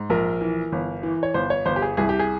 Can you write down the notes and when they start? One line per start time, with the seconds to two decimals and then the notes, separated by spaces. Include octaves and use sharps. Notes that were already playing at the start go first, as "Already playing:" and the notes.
Already playing: G#2
0.10 A#1 A#4
0.41 E3
0.72 G1
1.03 E3
1.23 C#5
1.34 G1 C5
1.50 C#5
1.66 G1 C5
1.76 G4
1.82 G#4
1.97 C2 G#4
2.09 G4
2.19 G#4